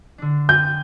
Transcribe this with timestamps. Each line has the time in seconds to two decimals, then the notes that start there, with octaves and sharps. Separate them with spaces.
0.18 D3 D4
0.49 G5 G#5 G6